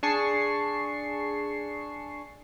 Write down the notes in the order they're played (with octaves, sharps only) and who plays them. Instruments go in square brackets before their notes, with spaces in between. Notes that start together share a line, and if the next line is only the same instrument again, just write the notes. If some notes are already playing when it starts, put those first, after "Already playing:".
[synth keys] D4 G#4 A5 C#6 C7